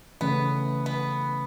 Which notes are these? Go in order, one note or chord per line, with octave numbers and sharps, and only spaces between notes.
C#3 E3 A3 B3 C#4
B3